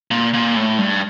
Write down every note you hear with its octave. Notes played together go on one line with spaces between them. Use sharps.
A#2
A#2
A2
G2